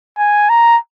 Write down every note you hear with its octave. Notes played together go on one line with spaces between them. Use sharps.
G#5
A#5